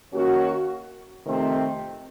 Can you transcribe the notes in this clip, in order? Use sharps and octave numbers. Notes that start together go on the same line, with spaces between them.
D#3 A#3 C#4 F#4
F2 C3 D#3 A3 C4